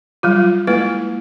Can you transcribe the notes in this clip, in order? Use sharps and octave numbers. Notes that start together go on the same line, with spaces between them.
F#3 G3 F4
G#3 A#3 E4 B4